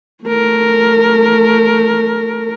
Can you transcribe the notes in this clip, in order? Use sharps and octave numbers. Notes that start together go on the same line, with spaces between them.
A3 A#4